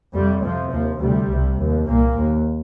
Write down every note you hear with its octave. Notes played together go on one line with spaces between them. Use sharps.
F2 C3 G3
F2 C3 F3
D#2 F3
D2 C3 G3
C2 C3
D#2
C2 A#2 A#3
D#2